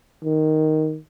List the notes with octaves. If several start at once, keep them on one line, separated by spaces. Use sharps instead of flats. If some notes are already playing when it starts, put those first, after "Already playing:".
D#3